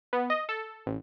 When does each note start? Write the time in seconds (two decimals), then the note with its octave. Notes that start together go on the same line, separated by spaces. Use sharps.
0.13 B3
0.30 D#5
0.49 A4
0.86 A1